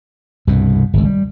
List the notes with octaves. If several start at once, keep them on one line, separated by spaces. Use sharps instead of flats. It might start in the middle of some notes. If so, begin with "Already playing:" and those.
C2 G2 B2
G#1 C#2
G3